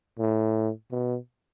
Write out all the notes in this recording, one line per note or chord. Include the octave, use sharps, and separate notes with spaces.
A2
B2